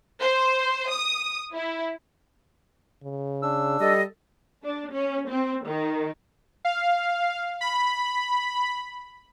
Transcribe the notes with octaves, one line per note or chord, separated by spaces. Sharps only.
C5
D#6
E4
C#3
D4 E6
G3 A4 D#5
D4
C#4
C4
D#3
F5
B5